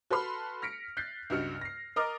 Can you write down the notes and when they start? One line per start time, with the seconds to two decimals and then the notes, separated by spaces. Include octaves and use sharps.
0.11 F#4 A4 B4 B5 C6 F6
0.62 F6 A#6 B6 C#7 D7
0.97 F#6 G6 A6 B6 C7
1.30 C#2 G2 F#4 F6 C#7
1.61 A#6 C7
1.96 A#4 D#5 A#5 D6 F6 A6